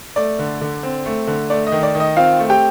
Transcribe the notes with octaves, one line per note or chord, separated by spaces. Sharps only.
A3 D5
D3
D3
C4
A3
D3
A3 D5
D#5
D#3
D5
D#3
D#5
C4 F4 F5
A3
G4 G5